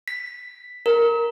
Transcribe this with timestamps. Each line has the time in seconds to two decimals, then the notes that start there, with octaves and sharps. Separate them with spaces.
0.08 B6
0.86 A#4